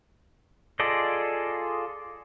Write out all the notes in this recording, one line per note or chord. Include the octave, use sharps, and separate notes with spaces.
F4 G#4 A4 D5 D#5